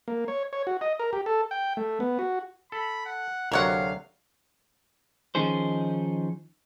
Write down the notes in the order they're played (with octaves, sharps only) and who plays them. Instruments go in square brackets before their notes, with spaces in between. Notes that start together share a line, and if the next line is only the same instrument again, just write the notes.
[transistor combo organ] A#3
C#5
C#5
F#4
D#5
A#4
G4
A4
G5
A3
B3
F#4
[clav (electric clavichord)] A4 [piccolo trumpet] B5
[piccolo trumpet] F#5
[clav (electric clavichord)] D2 C3 F#3 [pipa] A#4 C#5 F#5 [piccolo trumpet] F5
[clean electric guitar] D#3 F3 C#4 D#4 G#4 C5